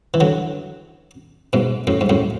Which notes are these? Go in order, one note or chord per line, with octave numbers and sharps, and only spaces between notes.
E3
D3 F#3
G#2 B2
F#2 A2
G#2
F#2 A2